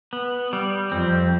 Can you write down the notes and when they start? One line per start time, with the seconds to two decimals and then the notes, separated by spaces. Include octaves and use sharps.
0.13 B3
0.53 G3
0.91 F2 C4